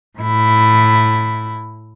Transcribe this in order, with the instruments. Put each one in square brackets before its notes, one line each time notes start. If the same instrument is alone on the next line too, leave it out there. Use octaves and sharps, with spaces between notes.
[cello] A2 E4